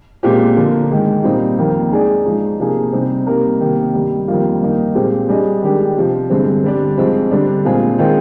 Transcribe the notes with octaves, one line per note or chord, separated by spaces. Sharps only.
A#2 G#3 C4 G4
D3 F3 A#3
G#2 D#3 G#3
A#2 G3 C4 D#4
F2 D#3 A#3
G#3 D#4 G#4 D5
G#2 F3 G#3 D#4
C3 F3 A#3 D#4 G#4
C3 G3 C4 D#4
C3 G3 A#3 D#4 A#4
C3 D#3 A#3
G2 D#3 G3
F2 D#3 G3 A#3 F4
G2 D#3 A#3 D#4
A#2 F3 G#3 C4 G4
G3 D4 G#4 D#5
D#3 G#3 D4 G4
C3 F3 C4
G2 D3 G#3 C4
D3 G3 D4
G#2 F3 G#3 C4
D3 G3 D4
A#2 G#3 C4 F4 G#4
D#3 G#3 C4 F4 C5